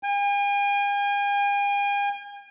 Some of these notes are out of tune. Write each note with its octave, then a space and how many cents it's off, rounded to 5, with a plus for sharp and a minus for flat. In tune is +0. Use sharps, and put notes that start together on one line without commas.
G#5 -45